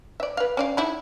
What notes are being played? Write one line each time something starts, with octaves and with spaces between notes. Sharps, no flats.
D5 E5
B4 F5
C#4 D5 F5
D#4 E4 B5